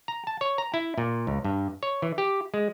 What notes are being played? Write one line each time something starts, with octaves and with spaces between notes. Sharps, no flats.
A#5
A5
C#5
A#5
E4
A#2
C#2
G2
C#5
E3
G4
G#3